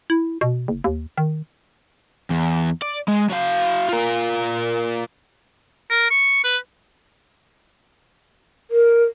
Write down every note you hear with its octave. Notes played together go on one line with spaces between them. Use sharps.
E4
B2
F#1
D#2
D#3
E2
D5
G#3
F#3 F5
F4 A#4
A#4
C#6
B4
A#4